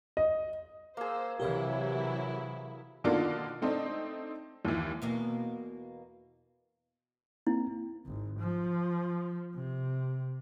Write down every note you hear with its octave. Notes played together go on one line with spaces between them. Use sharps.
D#5
A#3 G#4 C5 E6
C3 E3 F#3 E4 G4 A#4 C#5
B2 D3 D#3 A#3 D4 F4
A3 C4 D4 D#4
D#2 E3
E2 B2 A#3
A#3 C4 E4
G#1
F3
C3